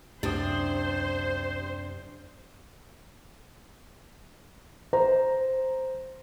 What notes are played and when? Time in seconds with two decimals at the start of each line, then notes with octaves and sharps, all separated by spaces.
0.23 C#2 F#2 C3 D4 G4 C5 D#6
4.93 C5 A#5